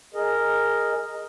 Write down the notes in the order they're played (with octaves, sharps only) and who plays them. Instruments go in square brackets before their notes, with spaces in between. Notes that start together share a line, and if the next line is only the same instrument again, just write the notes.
[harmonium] G#4 A#4 D#5